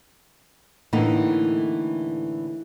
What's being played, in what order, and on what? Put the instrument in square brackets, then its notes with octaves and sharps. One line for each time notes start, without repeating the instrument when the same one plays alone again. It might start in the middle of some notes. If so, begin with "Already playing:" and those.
[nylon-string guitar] A2 D3 E3 A3 A#3 D#4